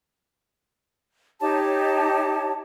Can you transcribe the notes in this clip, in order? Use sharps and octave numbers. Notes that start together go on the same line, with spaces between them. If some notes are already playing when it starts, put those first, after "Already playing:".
D#4 G4 C#5 A5